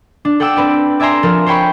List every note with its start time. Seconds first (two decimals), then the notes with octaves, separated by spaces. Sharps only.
0.25 D4
0.40 A4 F#5 G5 D6 E6
0.56 C4 B4 D5
1.00 D5 E5 G#5 A#5 C6
1.23 F3 A4 A#4
1.46 C5 C#5 G5 B5 C#6